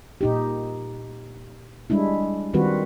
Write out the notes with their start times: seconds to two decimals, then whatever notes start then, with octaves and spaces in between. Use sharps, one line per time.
0.21 A#2 D#4 G4
1.90 G3 G#3 D4 E4
2.54 D#3 G3 C4 F4 F#4 B4